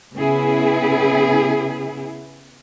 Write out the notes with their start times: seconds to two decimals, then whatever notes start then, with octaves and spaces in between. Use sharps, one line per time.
0.16 C#3 B3 E4 G#4